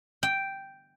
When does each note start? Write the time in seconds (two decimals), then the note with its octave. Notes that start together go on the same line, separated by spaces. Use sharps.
0.23 G5